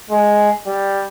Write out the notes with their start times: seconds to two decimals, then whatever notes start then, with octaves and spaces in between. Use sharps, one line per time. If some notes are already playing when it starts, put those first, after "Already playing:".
0.11 G#3
0.66 G3